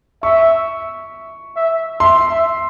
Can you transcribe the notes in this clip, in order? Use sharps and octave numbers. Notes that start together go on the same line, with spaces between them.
E5 C#6
E5
E5 C6
E5